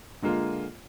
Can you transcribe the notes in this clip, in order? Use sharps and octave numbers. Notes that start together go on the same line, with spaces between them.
D3 G#3 A#3 F4